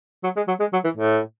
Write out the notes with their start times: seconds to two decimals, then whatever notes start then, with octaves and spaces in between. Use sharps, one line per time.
0.23 F#3
0.36 G#3
0.48 F#3
0.60 G#3
0.73 F#3
0.84 E3
0.97 A2